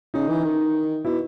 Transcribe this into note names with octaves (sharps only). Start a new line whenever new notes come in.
C#3 D#4
E3
D#3
B2 E4